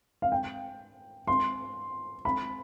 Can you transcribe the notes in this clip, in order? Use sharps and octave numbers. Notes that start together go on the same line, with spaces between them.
F5
G5
C6
B5